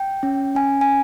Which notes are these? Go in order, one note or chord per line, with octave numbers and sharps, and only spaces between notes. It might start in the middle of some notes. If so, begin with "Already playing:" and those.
Already playing: G5
C#4
C#4 G#5
G#5